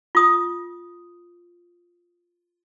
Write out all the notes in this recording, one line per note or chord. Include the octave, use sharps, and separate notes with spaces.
F4 D#6